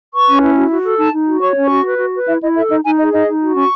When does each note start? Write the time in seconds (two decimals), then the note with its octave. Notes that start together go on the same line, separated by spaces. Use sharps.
0.13 B4 C#6
0.28 C#4
0.42 E4
0.56 F#4
0.71 F#4
0.85 A4
0.98 D#4 A5
1.13 D#4
1.27 F#4
1.41 C#5 C#6
1.56 C#4
1.63 C#6
1.70 F#4
1.85 B4
1.98 F#4
2.13 B4
2.28 E4 E5
2.41 E4 D#5
2.55 A4 E5
2.70 D#4 D#5
2.84 D#4 G#5
2.98 G#4 D#5
3.13 D#4 D#5
3.28 D#4
3.41 F#4
3.56 C#4 C#6